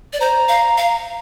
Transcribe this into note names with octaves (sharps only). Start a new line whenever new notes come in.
D5
C5 A#5
F5
F5